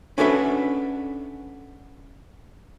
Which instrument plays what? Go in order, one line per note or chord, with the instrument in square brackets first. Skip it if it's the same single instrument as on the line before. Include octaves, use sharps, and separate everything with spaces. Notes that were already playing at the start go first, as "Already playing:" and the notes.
[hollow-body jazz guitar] C#4 D4 F#4 A4 B4 E5